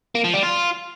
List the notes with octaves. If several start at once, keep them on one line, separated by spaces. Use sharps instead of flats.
A#3
F3
G3
F4